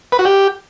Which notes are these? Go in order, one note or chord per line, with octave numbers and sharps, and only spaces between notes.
B4
F#4
G4